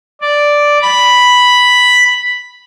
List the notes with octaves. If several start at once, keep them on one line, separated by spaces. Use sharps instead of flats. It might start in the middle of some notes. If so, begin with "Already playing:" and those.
D5
B5